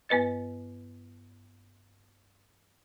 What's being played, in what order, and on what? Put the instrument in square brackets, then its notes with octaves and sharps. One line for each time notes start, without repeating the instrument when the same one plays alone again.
[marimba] G2 B3 B4 D#5 A6